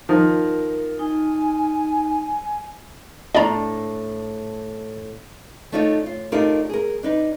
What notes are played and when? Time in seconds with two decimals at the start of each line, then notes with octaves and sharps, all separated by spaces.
0.09 D#3 F3 A#4
0.99 D#4 G#5
3.35 A2 D4 D5 A#5
5.72 A3 D4 D#4 F4 C#5
6.06 F4
6.32 A3 D4 D#4 F4 G4 A#4
6.69 G#4 A#4
7.03 D4 D#4 B4